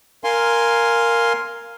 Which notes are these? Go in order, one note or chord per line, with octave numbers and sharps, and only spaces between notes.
A#4 F5 G#5 C6